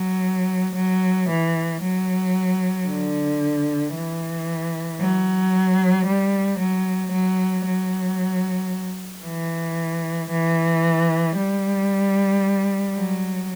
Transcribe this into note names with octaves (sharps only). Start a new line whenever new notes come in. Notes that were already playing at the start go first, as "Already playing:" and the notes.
Already playing: F#3
F#3
E3
F#3
D3
E3
F#3
G3
F#3
F#3
F#3
E3
E3
G3
F#3